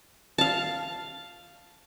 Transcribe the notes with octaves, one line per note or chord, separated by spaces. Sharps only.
F5 A5